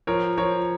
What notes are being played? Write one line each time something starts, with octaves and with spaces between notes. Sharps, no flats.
F3 A#4 C#5
F3 A#4 C#5